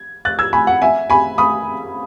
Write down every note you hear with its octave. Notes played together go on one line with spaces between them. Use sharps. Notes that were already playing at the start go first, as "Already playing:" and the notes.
Already playing: G#6
F#6 A6
E6 G#6
G#5 B5
F#5
E5 G#5
G#5 B5
B5 D#6